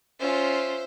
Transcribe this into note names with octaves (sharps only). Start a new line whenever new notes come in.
C#4 F4 C5 E5